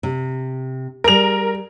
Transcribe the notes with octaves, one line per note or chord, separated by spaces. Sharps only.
C3
G3 G#4 A#4 F7